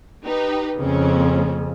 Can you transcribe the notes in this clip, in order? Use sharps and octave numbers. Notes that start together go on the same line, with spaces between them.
D#4 G4 B4
F2 C#3 A#3 C4 C#4